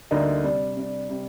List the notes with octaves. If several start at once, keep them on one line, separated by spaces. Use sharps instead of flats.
D2 D3 G3 A#3 D#4
C3 G3 D4
C3 G3 D4
C3 G3 D4